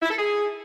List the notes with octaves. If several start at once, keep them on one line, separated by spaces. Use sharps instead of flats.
E4
A4
G#4